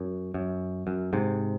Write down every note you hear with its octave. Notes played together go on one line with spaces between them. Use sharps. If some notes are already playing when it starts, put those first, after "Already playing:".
Already playing: F#2
F#2
F#2
G#2 C3